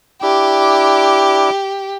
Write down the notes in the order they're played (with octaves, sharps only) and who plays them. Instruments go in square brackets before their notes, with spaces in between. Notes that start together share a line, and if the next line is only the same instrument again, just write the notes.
[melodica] D4 E4 D6 [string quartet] G4